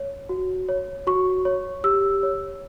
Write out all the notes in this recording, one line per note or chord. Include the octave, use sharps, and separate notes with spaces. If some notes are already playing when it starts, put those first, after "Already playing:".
Already playing: C#5
F#4
C#5
F#4 C#6
C#5
G4 E6
C#5